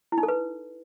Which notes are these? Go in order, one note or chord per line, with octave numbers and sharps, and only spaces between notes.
E4
D#4
A4
B4